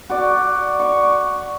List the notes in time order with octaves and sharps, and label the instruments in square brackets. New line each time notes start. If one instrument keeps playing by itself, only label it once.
[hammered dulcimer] F#4 D5
C#6 D6